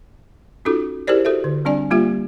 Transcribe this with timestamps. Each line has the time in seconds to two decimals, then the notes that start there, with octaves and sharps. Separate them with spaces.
0.65 C#4 D#4 F4 F#4 A4
1.07 E4 G4 G#4 A#4 C5 D5
1.25 F#4 A4 C5 E5
1.44 D3
1.65 G3 C4 D4 D5 G#5
1.91 G3 A#3 F4 G4 E5